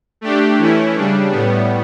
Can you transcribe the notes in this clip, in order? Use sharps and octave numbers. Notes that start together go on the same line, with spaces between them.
A3 D4 G4
E3 A3 C#4 E4
C#3 G3 D4
A2 G3 B3